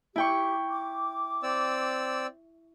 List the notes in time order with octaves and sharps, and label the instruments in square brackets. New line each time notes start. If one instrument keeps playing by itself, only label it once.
[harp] E4 G5 C#6 [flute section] G4
[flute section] D6
[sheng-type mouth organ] C4 D5 E6